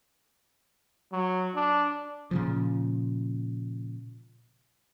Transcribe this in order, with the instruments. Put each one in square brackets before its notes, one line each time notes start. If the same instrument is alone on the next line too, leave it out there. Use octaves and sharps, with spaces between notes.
[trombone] F#3
D4
[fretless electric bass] A#2 C#3 F3